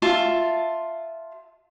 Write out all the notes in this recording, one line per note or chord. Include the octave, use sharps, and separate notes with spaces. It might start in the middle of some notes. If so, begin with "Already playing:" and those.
F4 E5 A5